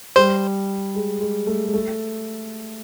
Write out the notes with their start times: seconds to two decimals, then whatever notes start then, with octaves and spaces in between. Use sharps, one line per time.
0.16 G3 C5
0.95 G#3
1.20 G#3
1.47 A3
1.65 G#3
1.73 A3